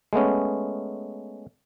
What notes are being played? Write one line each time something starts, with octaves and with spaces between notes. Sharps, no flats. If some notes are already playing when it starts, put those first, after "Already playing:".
G#3 A3 B3 C#4